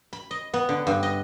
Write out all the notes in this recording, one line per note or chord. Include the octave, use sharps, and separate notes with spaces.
B5
D#5
B3
D3
G2
D#5